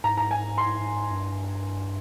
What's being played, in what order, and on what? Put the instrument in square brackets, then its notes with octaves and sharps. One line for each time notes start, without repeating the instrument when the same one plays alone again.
[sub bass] G#2 [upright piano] A#5
[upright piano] A#5
G#5
C6
[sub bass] G2